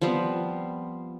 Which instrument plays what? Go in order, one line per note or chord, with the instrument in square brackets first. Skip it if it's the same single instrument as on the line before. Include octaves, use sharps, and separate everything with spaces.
[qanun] F3 G3 B3 C4